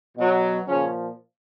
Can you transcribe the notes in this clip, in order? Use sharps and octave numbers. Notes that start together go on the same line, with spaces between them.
B2 F#3
A#2 C#3 F3 C#4